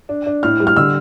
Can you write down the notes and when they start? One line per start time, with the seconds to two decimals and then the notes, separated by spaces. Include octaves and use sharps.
0.09 D4
0.26 D4
0.43 A2 F6
0.60 G3
0.67 F6
0.76 D3 E6